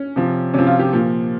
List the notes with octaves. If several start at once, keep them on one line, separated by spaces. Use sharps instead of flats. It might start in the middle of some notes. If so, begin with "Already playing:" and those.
Already playing: C#4
C3 F3
C3 F3 C#4
F4
G4
A#2 F3